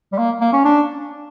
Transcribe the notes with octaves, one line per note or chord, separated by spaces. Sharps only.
G3
A#3
A#3
C#4
D4